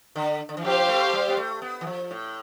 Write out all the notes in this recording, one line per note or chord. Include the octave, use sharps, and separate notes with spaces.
D3
D3
E3
F3 G4 C5 F5
A3
G3
B3
A3
B3
E3
F3
A2